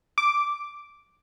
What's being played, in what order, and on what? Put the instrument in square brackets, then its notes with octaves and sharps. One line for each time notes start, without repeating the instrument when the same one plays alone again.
[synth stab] D6